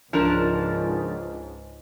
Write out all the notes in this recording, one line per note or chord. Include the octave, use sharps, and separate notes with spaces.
C#2 G#2 F3 D4 A#4